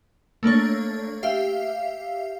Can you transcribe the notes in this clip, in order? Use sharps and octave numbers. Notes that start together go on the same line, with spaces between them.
A3 A#3 D4 C#5
G4 E5 F5 C7